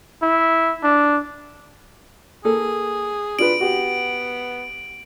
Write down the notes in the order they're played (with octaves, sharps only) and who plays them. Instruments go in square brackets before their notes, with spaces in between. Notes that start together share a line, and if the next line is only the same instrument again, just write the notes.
[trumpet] E4
D4
[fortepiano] A#3 A4 [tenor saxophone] G#4
[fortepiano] D4 F4 B4 [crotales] D7 F#7
[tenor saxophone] B3 [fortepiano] F#4 G4